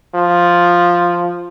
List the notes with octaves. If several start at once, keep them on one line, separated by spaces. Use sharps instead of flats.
F3